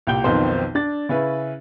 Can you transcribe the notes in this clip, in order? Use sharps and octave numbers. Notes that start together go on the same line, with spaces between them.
C2 A#2 G5 G6 G7
B1 F2 D#3 B3 C4 C5
D4 A6
C#3 C#4 E4 B4